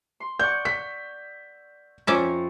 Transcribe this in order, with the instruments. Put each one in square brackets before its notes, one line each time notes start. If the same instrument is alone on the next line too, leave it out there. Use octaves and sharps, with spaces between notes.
[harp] C6
[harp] D5 F#5 C#6 [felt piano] G6
[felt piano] B6
[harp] F2 A#5 C#6 [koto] C#4 D5 E5